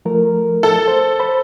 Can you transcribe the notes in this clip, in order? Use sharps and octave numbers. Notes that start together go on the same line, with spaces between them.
F3 A3 A#4
A4
C5
C5 B5